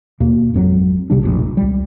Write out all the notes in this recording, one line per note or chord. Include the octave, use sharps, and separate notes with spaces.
D#2 B2 A#3
G#1 F2 F#3
B1 C3 G3 D4
F1 A#1
C#2 G3